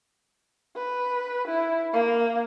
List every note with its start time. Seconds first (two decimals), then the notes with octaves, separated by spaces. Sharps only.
0.76 B4
1.48 E4
1.93 A#3